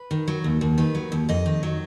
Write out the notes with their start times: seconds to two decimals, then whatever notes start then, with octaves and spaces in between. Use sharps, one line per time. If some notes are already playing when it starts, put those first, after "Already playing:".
Already playing: B4
0.11 D#3
0.28 F#3
0.44 D#2
0.61 D#2
0.78 D#3 B4
0.95 F#3
1.12 D#2
1.29 F2 D#5
1.46 D#3
1.63 F#3